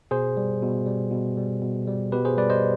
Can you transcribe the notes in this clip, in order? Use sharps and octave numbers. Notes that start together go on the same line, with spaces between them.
B2 G#4 C5
G3
B2
G3
B2
G3
B2
G3
B2 G4 B4
G#4 C5
G3 B4 D5
C5 D#5